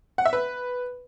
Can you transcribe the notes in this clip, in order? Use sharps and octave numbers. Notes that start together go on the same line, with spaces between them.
F#5
E5
B4